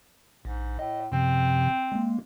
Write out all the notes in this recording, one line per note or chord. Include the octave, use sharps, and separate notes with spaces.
A#1 G#2
A2 D#5
F#2 C3 F3 C4
G#3 A#3